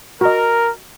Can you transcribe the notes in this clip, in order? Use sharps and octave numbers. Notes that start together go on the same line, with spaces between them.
F#4 A#4 D#5